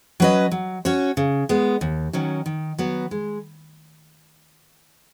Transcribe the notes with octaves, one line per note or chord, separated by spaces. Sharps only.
F#3 C#4 B4 D#5
F#3
C#4 F#4 C#5
C#3
G#3 B3
D#2
D#3 F#3 C#4
D#3
F#3 B3 F#4
G#3